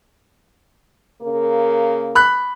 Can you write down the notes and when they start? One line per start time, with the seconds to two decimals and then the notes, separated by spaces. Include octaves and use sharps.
1.21 C#3 A#3 A#4
2.15 B5 F#6